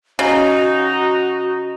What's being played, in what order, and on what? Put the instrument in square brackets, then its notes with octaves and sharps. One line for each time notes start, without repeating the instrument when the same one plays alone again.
[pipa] C#3 [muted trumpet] D#4 [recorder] F#4 [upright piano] D#5 A#5